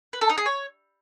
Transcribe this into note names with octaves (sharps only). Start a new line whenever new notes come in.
B4
A4
D#4
G#4
C#5